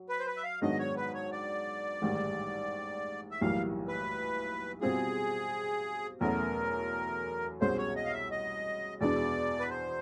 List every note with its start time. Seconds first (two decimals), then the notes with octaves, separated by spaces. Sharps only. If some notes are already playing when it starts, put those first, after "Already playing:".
Already playing: F#3
0.09 B4
0.19 C5
0.26 B4
0.37 E5
0.44 F5
0.62 G#2 D#3 F#3 B3 D4 D#5
0.79 C#5
0.96 B4
1.14 C#5
1.32 D5
2.02 A1 G#2 D#3 G3
3.31 E5
3.41 B1 A2 E3 G3 A#3 F5
3.88 B4
4.81 B2 G3 C4 F4 G#4
6.21 E2 B2 F#3 A3 C#4 A#4
7.61 C2 B2 G#3 C#4 C5
7.78 C#5
7.96 D#5
8.05 F5
8.13 E5
8.31 D#5
9.01 E2 B2 G#3 B3 D4 D5
9.60 B4
9.70 C5